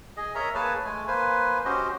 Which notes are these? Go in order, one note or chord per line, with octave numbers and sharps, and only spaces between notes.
G#4 D#5
A#4 C#5 D#5 E5 A#5
A#3 G#4 B4 C#5 G#5 A5
G#3 A3 G#5
A#3 B4 C5 G#5
C#4 F#4 G4 C5 D#5